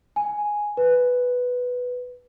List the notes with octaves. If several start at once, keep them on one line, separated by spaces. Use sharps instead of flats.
G#5
B4